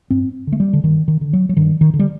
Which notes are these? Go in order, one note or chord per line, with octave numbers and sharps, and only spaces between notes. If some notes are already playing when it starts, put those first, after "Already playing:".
G2 C4
D3
A3
G3
D3
G2 D#3
D#3
D3
F#3
F#3
G2 D#3
D#3
D3
G3